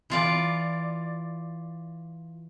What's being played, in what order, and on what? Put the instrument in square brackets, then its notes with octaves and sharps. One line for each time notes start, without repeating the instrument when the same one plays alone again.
[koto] E3 F4 D5